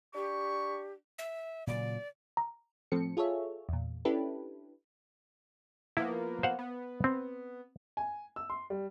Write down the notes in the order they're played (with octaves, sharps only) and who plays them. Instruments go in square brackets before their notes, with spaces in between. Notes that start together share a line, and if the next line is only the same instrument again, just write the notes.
[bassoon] D4 [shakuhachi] G4 [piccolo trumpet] C#6
[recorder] E5
[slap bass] A#2 C#3 F#3 [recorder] D5
[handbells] A#5
[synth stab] A2 F3 C4 A4 C#7
F4 G#4 A4 C#5 E5
E2 A#2
C#4 D4 E4 G4 A4 B4
[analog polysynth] F3 A#3 B3 [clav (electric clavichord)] E4
[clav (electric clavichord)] C5 F5 F#5
[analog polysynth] B3
[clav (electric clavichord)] C4
[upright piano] G#5
E6
C6
G3